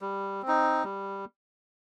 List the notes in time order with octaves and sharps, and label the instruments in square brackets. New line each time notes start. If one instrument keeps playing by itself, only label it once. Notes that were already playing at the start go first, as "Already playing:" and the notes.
[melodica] G3
C4
D#4
G3